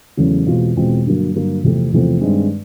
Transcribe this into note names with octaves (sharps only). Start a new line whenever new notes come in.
E2 C#3 F#3 A3 C#4
E2 B2 G#3 C4 F4
E2 B2 G#3 C4 F4
G2 D3 F#3 A#3
G2 D3 F#3 A#3
E2 C3 F3 A3 C4
E2 C3 F3 A3 C4
G2 D#3 G#3 C4